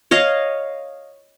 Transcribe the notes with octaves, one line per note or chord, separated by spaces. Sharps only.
C#5 D#5 F5